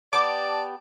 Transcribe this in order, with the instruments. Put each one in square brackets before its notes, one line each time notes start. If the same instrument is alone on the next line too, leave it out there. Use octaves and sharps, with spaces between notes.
[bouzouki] B3 G4 [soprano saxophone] D5 [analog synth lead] A5 [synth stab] D6